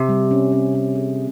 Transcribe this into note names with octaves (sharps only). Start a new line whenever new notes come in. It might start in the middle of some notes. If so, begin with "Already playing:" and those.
Already playing: C3
G3
C#4
C#4
C#4
G#4